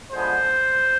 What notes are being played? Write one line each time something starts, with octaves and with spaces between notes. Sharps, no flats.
D3 F3 G#3 B3 C5